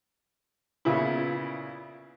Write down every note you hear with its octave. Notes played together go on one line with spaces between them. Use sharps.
A#2 C#3 B3 E4